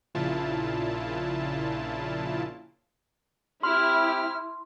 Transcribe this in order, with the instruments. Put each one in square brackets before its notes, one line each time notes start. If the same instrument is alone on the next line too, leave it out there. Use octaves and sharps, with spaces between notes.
[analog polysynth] A#1 A#2 C#3 E4 F4 A5
[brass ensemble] C4 G4 [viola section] E4 [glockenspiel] C6 [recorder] F6